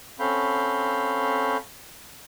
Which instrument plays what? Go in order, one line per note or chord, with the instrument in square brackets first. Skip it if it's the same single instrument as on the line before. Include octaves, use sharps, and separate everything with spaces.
[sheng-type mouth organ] C4 C#4 A4 F5 B5 G6